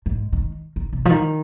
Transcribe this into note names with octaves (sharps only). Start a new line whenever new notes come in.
G#2
D#3
D#3
C3
F3
D#3